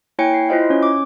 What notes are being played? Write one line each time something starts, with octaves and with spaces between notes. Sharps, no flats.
A#3 E4 C#5 G5 G#5 C#7
C7
E4 F4 C5 D#5 F5
C#4 C#5
D6